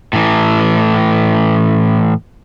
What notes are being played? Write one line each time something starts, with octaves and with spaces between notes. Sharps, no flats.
A2 E3